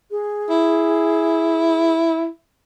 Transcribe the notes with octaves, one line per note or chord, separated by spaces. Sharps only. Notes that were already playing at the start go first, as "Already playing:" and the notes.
G#4
E4